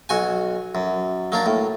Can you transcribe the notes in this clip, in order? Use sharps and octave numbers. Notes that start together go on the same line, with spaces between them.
B1 F#4 G#5
F#2
F#3 A#3 D4
A2